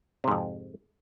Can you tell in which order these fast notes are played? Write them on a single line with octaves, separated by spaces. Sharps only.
C3 G#2 F2